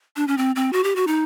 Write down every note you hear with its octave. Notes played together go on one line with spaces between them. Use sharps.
D4
C#4
C4
C4
F#4
G4
F#4
D#4